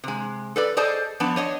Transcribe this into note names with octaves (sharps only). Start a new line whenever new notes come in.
C3 G#3
A4 B4 D5
G#4 A4 C5 D5 D#5 A5
F3 B3 D4 A5
D4 C#5 D#5